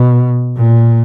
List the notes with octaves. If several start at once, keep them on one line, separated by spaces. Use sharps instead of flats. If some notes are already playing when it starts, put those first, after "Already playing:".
Already playing: B2
A#2